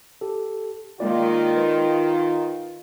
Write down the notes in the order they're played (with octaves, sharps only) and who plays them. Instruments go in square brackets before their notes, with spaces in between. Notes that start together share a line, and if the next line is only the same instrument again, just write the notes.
[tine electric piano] G4 A4
[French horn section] D#3 F4 [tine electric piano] G#3 A#3 D5
[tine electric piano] B4